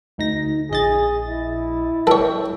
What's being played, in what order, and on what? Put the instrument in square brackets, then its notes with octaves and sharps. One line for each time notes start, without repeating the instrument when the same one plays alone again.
[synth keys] D2 D#4 A#6
[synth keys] A#1 D#5 A6 [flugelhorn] G#4
[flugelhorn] E4
[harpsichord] A4 C#5 [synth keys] G5